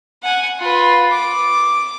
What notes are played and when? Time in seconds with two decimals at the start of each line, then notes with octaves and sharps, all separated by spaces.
0.23 F#5 G#5
0.59 F4 B4
1.11 D6